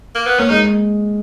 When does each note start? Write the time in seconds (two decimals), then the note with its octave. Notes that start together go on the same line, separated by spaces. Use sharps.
0.15 A#3
0.26 B3
0.39 A#3 C#4
0.50 G#3 D#4